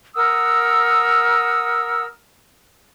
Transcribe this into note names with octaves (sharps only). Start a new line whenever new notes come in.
A#4 F#5 D#6 E6